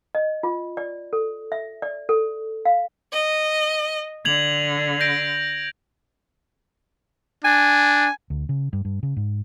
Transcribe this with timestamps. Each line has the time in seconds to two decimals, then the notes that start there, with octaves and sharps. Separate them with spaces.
0.15 D#5
0.43 F4
0.77 D5
1.13 A4
1.52 E5
1.82 D5
2.09 A4
2.65 F5
3.12 D#5
4.25 D3 G#6 F7 F#7
5.00 G6 A#6 D7
7.45 D4 G#5
8.30 D2
8.49 C#3
8.73 G2
8.85 G2
9.03 C#3
9.17 G#2